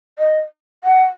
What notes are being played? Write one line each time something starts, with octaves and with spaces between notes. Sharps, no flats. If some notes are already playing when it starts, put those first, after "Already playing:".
D#5
F#5